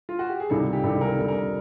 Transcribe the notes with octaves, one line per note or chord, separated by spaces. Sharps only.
F4
F#4
G4
G#4
C#2 C3 D#3 G3 A4
G4
C#2 C3 D#3 G3 A4
A#4
F2 D3 G3 A4
A#4